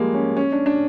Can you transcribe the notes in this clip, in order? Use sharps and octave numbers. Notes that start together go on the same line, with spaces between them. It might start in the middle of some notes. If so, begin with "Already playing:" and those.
Already playing: F3 G3 G#3 A#3
C#4
C#4
D4
D4